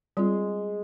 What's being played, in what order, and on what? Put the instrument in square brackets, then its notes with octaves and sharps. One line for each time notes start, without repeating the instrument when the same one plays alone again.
[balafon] G3 C4 F4 G#4 [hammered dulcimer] G#3